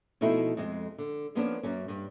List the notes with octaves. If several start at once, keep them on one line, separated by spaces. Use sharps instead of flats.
B2 F3 A3 D#4 E4 G#4
F2 G#3
D3
F3 A#3 B3 C#4 D4
F#2 A#3 C#4
G2